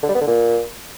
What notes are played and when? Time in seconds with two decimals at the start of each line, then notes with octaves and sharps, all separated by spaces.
0.03 D3
0.09 G3
0.15 B3
0.21 D3
0.27 A#2